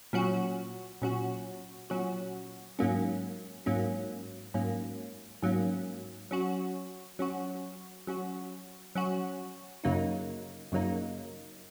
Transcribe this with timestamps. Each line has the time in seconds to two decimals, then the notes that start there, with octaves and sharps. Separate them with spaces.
0.13 A#2 F#3 C#4 F#4
1.02 A#2 F#3 C#4 F#4
1.90 A#2 F#3 C#4 F#4
2.79 G#2 F#3 A#3 C#4
3.66 G#2 F#3 A#3 C#4
4.54 G#2 F#3 A#3 C#4
5.43 G#2 F#3 A#3 C#4
6.31 F#3 C#4 F#4
7.19 F#3 C#4 F#4
8.07 F#3 C#4 F#4
8.95 F#3 C#4 F#4
9.84 F#2 C#3 F#3 A#3 D#4
10.72 F#2 C#3 F#3 A#3 D#4